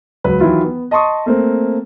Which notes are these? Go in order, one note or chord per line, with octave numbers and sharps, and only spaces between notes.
C#2 F#3 B4
D#3 E3 F#3 E4 F4
B3
D#5 A5 C6 C#6 D#6
A3 A#3 C4